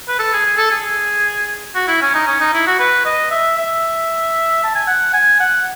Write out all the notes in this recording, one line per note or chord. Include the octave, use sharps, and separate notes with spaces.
B4
A4
G#4
G#4
A4
G#4
F#4
E4
C#4
D#4
C#4
D#4
E4
F#4
B4
D#5
E5
E5
A5
G#5
F#5
G#5
F#5